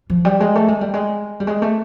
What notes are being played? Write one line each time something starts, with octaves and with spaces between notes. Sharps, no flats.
F3
G3
G#3
A3
G#3
G3
G#3
G3
G#3
A3